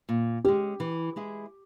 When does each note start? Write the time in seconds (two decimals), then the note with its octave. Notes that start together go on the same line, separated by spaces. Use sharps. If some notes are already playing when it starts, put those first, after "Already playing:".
0.09 A#2
0.45 G#3 C#4 G4
0.80 E3
1.16 G#3 E4 G#4